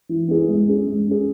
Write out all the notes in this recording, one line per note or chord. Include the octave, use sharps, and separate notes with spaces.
E3
B3 E4 G#4
G#3
C#4 G#4
G#3
C#4 G#4